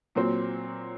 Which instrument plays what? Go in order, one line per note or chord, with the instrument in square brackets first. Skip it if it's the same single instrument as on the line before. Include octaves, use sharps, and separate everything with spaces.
[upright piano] A#2 F#3 C4